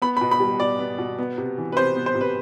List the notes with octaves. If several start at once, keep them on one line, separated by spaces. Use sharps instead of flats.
B3 B5
B5
B2
B5
G3
B2 D5
B3
B2
B3
C3
E3
B4
C3 C5
B3
C5
C3
B4